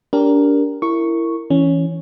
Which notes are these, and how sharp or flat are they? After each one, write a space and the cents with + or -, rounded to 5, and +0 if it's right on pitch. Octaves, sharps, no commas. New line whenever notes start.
D4 -30 G4 +0 A#4 +0
E4 +15 A#4 -20 C#6 +0
E3 +0 C#4 +0